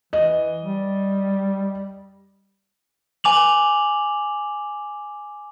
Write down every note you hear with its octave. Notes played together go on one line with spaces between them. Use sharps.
E3 D#5
G3
G#5 D6 F7 F#7